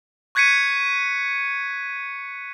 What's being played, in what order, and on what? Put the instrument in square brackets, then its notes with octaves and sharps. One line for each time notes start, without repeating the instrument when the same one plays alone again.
[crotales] C#6 F#6 G#6 B6 C#7 D#7